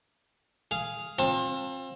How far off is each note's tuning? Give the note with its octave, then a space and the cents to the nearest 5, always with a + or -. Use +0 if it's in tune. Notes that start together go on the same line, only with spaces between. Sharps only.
G#4 +0 F5 -10
C4 +35 F4 +30 A5 +15